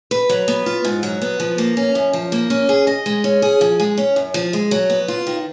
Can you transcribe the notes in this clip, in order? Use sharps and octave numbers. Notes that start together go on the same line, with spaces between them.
B4
F#3
B3
F4
G#2
F#3
B3
F3
A#3
C#4
F#2
F3
A#3
C#4
G#4
D#5
G#3
C#4
G#4
F3
G#3
C#4
F#2
F3
G#3
F#3
B3
F4
D#3